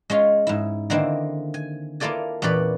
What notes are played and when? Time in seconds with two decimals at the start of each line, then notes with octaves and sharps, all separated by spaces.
0.10 G#3 C#4 F4
0.47 G#2 E4
0.90 D3 D#3 A#3 C4 E4
1.54 G#5
2.00 A#3 E4 F4 A4 D5 G#5
2.42 E2 A#2 C#4 B4 D5 B5